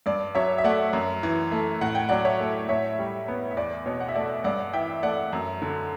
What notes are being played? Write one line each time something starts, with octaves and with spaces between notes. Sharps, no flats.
G2 D5
F#3 C#5 E5
E5
A3 D5 F#5
F#2
E3
A3
A2 F#5
G5
F#3 D5 F#5
C#5 E5
A3
A2 C#5 E5
G3
B3
E5
E2 D5
B2 C#5
F#5
E5
A3 D5
G2 D5 F#5
E3 E5 G5
A3 D5 F#5
F#2
D3